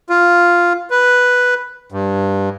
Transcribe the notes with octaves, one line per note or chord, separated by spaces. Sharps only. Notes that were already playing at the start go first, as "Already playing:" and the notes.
F4
B4
G2